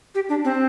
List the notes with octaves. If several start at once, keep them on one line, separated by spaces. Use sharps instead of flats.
G4
D4
C4